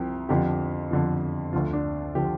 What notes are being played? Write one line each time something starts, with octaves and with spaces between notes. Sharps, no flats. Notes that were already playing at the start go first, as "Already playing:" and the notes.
Already playing: C2 C3 F3 G4
F2 D3 F3 G4
F2 D3 F3
D2 D3 F3 F4
D4
D3 F3 G4